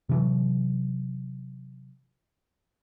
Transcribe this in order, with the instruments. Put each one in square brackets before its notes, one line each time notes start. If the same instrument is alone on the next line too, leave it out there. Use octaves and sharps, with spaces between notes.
[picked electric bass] C3 E3 F#3